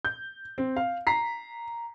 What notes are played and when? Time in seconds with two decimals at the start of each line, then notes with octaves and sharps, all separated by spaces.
0.05 G6
0.58 C4
0.76 F5
1.07 A#5 B6 C7